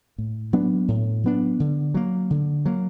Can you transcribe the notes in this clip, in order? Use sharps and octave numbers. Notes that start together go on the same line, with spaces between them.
A2
F#3 B3 D4
A2
F#3 B3 D4
D3
F#3 A#3
D3
F#3 A#3